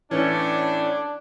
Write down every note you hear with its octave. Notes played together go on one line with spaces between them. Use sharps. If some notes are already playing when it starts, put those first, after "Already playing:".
A2 E3 A3 C#4 D4